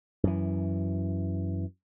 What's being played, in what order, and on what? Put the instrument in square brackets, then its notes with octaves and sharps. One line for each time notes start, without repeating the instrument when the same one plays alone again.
[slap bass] F#2 E3